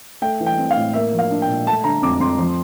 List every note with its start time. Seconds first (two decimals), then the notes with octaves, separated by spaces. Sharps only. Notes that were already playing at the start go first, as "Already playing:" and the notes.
0.22 A3 G5
0.40 E3
0.46 G5
0.58 C4
0.71 F5
0.76 A2
0.94 A#3 E5
1.12 F3
1.19 F5
1.30 D4
1.42 G5
1.48 A#2
1.67 A3 A5
1.84 D3 A#5
2.02 F2 D6
2.20 F2 C6
2.38 F3